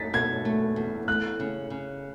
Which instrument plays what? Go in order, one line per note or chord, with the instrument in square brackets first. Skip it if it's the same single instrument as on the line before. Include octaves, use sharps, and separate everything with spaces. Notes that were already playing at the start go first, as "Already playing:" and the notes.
Already playing: [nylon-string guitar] D#4 [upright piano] A6 B6
[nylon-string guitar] B2 [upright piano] G#6
[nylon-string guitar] A3
E2
[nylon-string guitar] A3 [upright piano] F#6
[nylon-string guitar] C#3
C#3